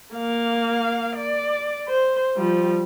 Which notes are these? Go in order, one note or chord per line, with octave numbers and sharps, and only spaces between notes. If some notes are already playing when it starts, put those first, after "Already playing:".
A#3 F5
D5
C5
F3 G3